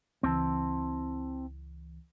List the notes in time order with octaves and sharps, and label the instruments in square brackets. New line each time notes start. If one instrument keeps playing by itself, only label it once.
[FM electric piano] C#2 E3 [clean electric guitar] C4 E4 A5